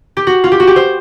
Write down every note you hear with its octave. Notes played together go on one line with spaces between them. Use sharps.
G4
F#4
F4
G4
F#4
G4
C5